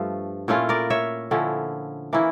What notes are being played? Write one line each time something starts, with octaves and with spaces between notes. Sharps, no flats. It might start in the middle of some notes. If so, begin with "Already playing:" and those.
Already playing: G2 F3 A3 F4
A#2 A3 C#4 E4 F4
A#4 D5
C#5 E5
D3 F3 C#4 E4
E3 A#3 C#4 E4